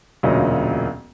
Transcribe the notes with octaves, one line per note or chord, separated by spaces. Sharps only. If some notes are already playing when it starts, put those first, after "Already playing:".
E1 D2 A#2 F#3 C#4 D#5